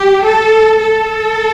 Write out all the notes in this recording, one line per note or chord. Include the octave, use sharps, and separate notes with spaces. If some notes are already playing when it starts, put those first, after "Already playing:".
Already playing: G4
A4
A4